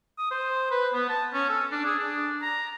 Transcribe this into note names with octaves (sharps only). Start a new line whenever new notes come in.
D#6
C5
B4
B3
A5
C#4
A4
D4
G#4
D4
A#5